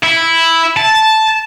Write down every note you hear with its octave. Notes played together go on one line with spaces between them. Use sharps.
E4
A5